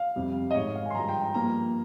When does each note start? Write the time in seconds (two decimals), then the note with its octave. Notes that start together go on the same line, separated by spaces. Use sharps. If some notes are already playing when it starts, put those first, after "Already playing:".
Already playing: F5
0.16 F2 C3 G3
0.50 D#5
0.55 G#2 D#3 G#3 C#5
0.75 F5
0.86 G#5
0.90 C6
0.94 G2 F3 G#3 A#5
1.09 G5
1.21 A#5
1.34 G2 F3 A#3 A#5